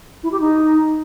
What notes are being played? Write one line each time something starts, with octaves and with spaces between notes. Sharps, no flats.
E4
G4
D#4